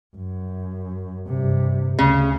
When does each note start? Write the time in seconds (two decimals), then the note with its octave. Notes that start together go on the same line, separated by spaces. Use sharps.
0.16 F#2
1.27 G2 C3
1.99 D2 C#3